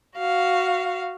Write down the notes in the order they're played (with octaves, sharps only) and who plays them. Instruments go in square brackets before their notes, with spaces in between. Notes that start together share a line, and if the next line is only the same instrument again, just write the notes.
[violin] F#4 F5